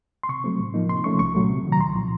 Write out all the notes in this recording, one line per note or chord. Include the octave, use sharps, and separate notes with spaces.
C6
C3 C#6
F#3 A3 C4
A2
F3 A#3 D#4
C3 C6
F3 A3 C#4 C#6
C2 C#6
A#2 F#3 A3
C3
D#3 F#3
A#5
C2 C6
A#2 F3